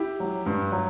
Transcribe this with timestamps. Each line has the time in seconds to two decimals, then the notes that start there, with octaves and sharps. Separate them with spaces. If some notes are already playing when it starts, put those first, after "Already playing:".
Already playing: E4 G4
0.20 F#3
0.46 G2
0.72 F#3